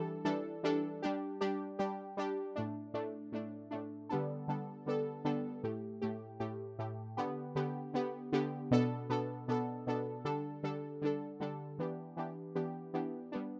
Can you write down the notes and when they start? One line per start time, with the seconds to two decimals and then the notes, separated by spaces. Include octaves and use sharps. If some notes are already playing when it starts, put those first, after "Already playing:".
Already playing: E3 G3 D4 A4
0.25 E3 G3 D4 A4
0.63 E3 G3 D4 A4
1.02 G3 D4 G4
1.41 G3 D4 G4
1.79 G3 D4 G4
2.17 G3 D4 G4
2.56 A2 A3 D4
2.94 A2 A3 D4
3.32 A2 A3 D4
3.71 A2 A3 D4
4.09 D3 G3 B3 D4 A4
4.48 D3 G3 B3 D4 A4
4.86 D3 G3 B3 D4 A4
5.25 D3 G3 B3 D4 A4
5.63 A2 A3 G4
6.02 A2 A3 G4
6.40 A2 A3 G4
6.79 A2 A3 G4
7.17 D3 B3 G4
7.55 D3 B3 G4
7.94 D3 B3 G4
8.32 D3 B3 G4
8.71 B2 B3 D4 A4
9.09 B2 B3 D4 A4
9.48 B2 B3 D4 A4
9.87 B2 B3 D4 A4
10.25 D3 G3 D4 A4
10.63 D3 G3 D4 A4
11.02 D3 G3 D4 A4
11.40 D3 G3 D4 A4
11.79 E3 B3 D4 G4
12.17 E3 B3 D4 G4
12.55 E3 B3 D4 G4
12.94 E3 B3 D4 G4
13.32 G3 B3 D4